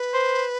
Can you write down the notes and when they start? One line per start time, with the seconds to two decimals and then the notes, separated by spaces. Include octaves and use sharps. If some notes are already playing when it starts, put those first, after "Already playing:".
Already playing: B4
0.14 C5